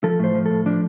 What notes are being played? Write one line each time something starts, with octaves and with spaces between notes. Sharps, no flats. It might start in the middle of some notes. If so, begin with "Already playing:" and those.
F3 A4
A2 C5
F3
A2 A4
F3 D4